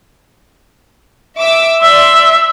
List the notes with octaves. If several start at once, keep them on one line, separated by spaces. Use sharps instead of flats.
E5 D6 E6
D5 E5 C6